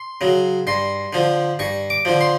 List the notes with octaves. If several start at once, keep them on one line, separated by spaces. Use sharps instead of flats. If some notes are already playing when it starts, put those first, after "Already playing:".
Already playing: C6
C#3 F#3
G2 C6
D3 F3
G2 C#6
D6
D3 F3
C6